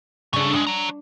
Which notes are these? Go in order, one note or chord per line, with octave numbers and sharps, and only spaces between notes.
C#3 C#4 D4 A4
A2 G#3 D4
C#5 A#5